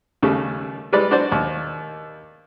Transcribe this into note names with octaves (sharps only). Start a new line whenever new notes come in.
D#2 C#3 G3 A3
G3 G#3 B4 D5
D4 F#4 C5 D5
D#2